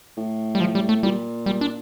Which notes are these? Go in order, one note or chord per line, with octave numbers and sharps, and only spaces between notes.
A2
G3
F3
G3
A3
A#2 G3
G3
D4